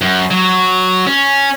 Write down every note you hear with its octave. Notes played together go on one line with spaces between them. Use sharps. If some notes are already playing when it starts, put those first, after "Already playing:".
F#2
F#3
C#4